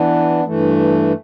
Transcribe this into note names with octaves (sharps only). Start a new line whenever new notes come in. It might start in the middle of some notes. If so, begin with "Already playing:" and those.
Already playing: E3 B3 D4
G2 E3 A3